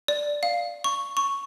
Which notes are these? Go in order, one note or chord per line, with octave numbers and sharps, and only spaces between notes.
D5
F5
C#6
C#6